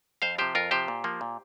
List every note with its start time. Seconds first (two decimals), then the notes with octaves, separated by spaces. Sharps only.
0.22 F2 C5 F5
0.38 C3 F3 G4 C5
0.55 F2 F4 A#4
0.71 C3 F3 G4 C5
0.88 A#2
1.04 F3 A#3
1.21 A#2